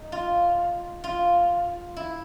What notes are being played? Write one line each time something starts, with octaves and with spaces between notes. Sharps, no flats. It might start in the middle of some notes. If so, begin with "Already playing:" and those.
Already playing: D#4
F4
F4
E4